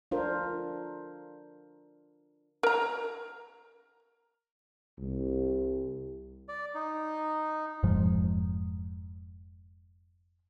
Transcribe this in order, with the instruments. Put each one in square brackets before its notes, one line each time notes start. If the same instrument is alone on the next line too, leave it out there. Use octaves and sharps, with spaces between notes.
[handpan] D4 F4 A4 A#4 C5
[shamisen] A#4 A#5
[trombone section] C2
[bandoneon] D5
D#4
[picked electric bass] F1 G#2 F3 G#3